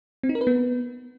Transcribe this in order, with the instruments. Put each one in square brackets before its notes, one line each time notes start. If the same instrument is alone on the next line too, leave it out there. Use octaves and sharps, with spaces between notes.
[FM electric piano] C4
D#4
A#4
B4
B3